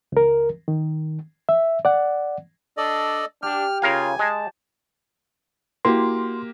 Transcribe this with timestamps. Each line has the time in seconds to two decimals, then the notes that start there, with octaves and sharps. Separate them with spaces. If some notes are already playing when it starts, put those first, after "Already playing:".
0.12 C#2 A#4
0.68 D#3
1.49 E5
1.85 D5 F#5
2.77 D4 A4 D5 D#5
3.43 D4 G4 F6
3.82 C#3 F4 A#4 F5 G#5
4.19 G#3 A5
5.85 A#3 E4 F#4 G4 C6